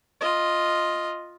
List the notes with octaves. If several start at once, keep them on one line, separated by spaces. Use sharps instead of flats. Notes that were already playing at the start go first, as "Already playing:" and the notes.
F4 D#5